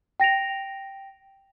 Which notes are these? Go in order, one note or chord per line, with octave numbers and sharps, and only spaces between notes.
G5 A#6 D7 F7